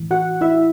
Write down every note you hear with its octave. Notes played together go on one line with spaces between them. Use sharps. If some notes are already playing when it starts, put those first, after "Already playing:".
Already playing: A2 E3
F#4 F#5
E4 E5